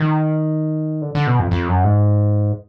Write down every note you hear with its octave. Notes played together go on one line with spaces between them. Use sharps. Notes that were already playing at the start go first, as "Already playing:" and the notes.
Already playing: D#3
D3
D3
B2
F2
F2
F#2
G#2